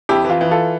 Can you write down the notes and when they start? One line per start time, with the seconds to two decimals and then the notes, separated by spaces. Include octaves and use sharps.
0.09 F2 E4 G4
0.24 E3
0.30 F4
0.41 E3
0.51 F4 A4